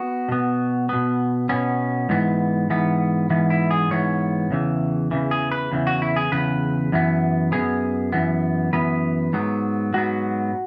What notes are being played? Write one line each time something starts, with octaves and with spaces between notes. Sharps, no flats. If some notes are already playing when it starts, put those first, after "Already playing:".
Already playing: B3 F#4
B2 B3
B2 B3
B2 B3 C#4
G#2 E3 B3
G#2 E3 B3
G#2 E3 B3
E4
G#4
G#2 E3 B3 C#5
E2 C#3 E3
E2 C#3 E3
G#4
B4
E2 C#3 E3
F#4
E4
G#4
E2 C#3 B4
F#2 E3 B3
E3 B3 G#4
F#2
F#2 E3 B3
F#2 E3 B3 B4
G#2 F#3 B3
G#2 F#3 B3 F#4